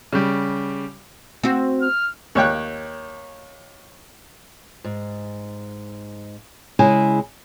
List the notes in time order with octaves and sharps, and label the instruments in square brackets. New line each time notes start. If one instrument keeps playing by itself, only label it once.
[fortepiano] C#3 G3
[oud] C4 F#4
[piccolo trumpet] F6
[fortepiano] D#2 C#5 G5 F#6
[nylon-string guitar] G#2
C#3 G#3 E4 G#5